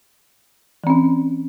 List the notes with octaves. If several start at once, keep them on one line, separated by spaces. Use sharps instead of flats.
E3 C4 C#4